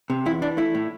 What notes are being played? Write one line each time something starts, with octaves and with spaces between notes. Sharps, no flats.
C3
E2 E4
E3 D4
A3 E4
A2